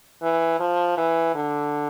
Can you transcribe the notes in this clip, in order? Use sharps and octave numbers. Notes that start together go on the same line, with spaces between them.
E3
F3
E3
D3